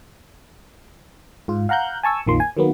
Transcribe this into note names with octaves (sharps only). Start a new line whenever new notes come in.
G#2 F4
F5 F#5 A#5 F#6 G6
G#5 A5 C#6 E6
A#1 F2 D#3 F3 A#3 C6
G#5
D#3 F#3 A#3 B3